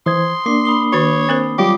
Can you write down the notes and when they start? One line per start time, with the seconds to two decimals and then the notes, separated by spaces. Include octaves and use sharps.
0.06 E3 C5 C6 D#6 G#6
0.46 A#3 D4 D6 C7
0.65 B5 D#6 G7
0.93 D#3 F#4 C#5
1.29 C4 A#4 C5
1.58 F#3 G3 F4 G4 D6